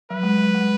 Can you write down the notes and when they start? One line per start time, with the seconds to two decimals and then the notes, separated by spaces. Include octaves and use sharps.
0.10 F#3 B4
0.23 G#3
0.37 F#3
0.55 G#3